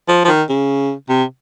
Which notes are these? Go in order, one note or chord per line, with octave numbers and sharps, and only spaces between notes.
F3
F3
D#3
C#3
C3